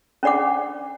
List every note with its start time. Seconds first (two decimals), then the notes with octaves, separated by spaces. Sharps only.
0.23 C#4 D4 D5 F#5 D6